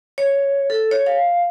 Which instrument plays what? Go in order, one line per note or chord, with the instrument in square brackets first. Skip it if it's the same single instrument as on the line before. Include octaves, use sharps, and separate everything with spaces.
[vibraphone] C#5
A4
C#5
F5